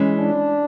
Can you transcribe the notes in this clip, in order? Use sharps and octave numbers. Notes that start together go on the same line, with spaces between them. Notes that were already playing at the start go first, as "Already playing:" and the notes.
Already playing: E3 G#3 C#4
D4